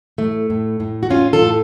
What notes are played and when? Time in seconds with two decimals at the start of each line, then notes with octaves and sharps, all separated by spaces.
0.18 A2 A3
0.50 A2
0.80 A2
1.03 F#4
1.10 A2 C#4 F4
1.33 F4 A4
1.41 A2